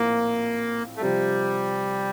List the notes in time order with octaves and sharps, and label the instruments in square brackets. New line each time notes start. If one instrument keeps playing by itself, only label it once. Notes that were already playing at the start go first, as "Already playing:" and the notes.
Already playing: [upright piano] A#1 A2 C4 F4 [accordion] A#3
[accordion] A3
[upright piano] C3 F3 C4 [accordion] G3